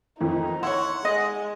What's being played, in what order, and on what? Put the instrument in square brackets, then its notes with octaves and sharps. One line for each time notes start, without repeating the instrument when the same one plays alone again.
[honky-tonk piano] F2 D#3 E3 [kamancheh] D#4
[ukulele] E4 C#5 [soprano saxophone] F#5 [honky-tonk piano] C6
[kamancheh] G#3 [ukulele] D#5